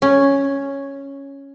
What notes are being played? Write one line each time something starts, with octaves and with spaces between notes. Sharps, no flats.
C#4